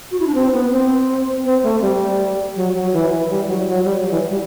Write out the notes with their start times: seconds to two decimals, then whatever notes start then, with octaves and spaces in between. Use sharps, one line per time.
0.11 F#4
0.20 E4
0.27 D4
0.35 C4
0.53 B3
0.72 C4
1.45 C4
1.63 A3
1.82 G3
2.56 F#3
2.74 F#3
2.93 E3
3.10 E3
3.30 G3
3.47 F#3
3.66 F#3
3.84 G3
4.03 F#3
4.11 E3
4.30 G3